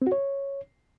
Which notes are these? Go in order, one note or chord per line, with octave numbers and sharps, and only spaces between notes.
C4
F#4
C#5